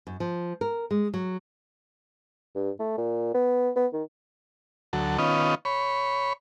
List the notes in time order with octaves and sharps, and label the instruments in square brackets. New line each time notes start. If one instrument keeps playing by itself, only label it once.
[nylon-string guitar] F#2
F3
A#4
G#3
F#3
[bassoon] G2
A3
A#2
B3
B3
D#3
[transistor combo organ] D2 F#3 A4
D#3 B3 C#4 F4 D#5
C#5 B5